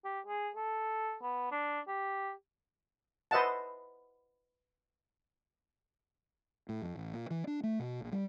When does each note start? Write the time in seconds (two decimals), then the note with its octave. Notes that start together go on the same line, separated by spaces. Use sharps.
0.04 G4
0.27 G#4
0.56 A4
1.22 B3
1.52 D4
1.88 G4
3.31 B4 C5 D#5 E5 F#5 A5
6.69 A2
6.82 F2
6.96 A1
7.13 A#2
7.31 E3
7.47 D4
7.63 A3
7.79 B2
8.01 A#1
8.12 G3